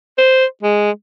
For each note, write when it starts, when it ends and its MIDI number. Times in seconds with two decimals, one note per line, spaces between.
0.18 0.45 72
0.62 0.91 56